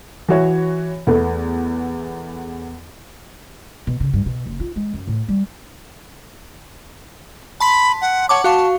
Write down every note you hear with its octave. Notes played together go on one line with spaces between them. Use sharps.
E3 F#4 C#5
E2 A3 B3
B2
C#3
G2
B2
F#1
F4
G#3
F#2
A2
G3
A5 B5 C6 B6
F#5
C#5 F#5 A5 D6
F#4 F5 A5 C#6